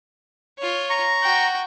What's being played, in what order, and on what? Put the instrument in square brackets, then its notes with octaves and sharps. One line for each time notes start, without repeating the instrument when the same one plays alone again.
[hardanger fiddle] F4 C#5
[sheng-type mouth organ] A#5 C#6
[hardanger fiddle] F#4 G5